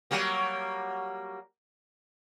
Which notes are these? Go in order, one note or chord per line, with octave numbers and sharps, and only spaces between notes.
F#3 G3 A#3